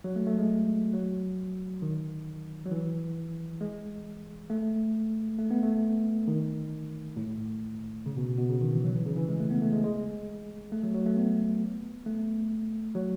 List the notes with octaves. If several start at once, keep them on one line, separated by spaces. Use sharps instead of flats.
F#3
A3
A3
G#3
F#3
D#3
F#3
E3
G#3
A3
A3
B3
A3
D#3
A2
C#3
B2
B2
C#3
D#3
E3
F#3
E3
C#3
E3
G#3
A3
B3
A3
G#3
G#3
A3
F#3
F#3
A3
B3
A3
F#3